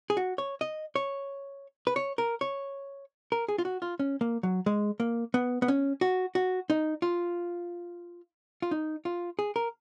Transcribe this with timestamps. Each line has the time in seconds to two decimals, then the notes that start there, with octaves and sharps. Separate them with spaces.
0.10 G#4
0.17 F#4
0.38 C#5
0.61 D#5
0.96 C#5
1.87 B4
1.96 C#5
2.18 A#4
2.41 C#5
3.32 A#4
3.48 G#4
3.58 F4
3.65 F#4
3.82 F4
3.99 C#4
4.21 A#3
4.43 F#3
4.66 G#3
5.00 A#3
5.34 B3
5.62 B3
5.68 C#4
6.01 F#4
6.35 F#4
6.70 D#4
7.02 F4
8.62 F4
8.71 D#4
9.05 F4
9.39 G#4
9.56 A#4